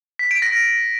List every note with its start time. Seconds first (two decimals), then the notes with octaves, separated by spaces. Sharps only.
0.19 B6
0.31 D7
0.42 A#6